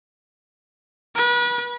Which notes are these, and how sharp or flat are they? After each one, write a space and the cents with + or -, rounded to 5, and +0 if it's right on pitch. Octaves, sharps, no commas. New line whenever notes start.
B4 -35